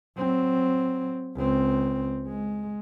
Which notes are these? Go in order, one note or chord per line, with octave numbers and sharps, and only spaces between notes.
F#3 C4
C#2 C4
G#3